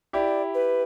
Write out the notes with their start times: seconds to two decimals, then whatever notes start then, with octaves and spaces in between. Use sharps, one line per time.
0.13 E4 G4 D5
0.54 B4